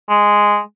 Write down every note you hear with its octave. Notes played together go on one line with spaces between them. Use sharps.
G#3